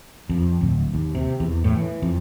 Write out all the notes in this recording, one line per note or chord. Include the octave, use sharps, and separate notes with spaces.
F2
D1
D#2
C3
E2
A2
E3
F2